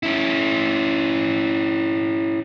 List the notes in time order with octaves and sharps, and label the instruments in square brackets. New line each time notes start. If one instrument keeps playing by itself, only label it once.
[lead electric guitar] C#4 E4